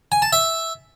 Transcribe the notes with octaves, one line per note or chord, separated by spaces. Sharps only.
G#5
A5
E5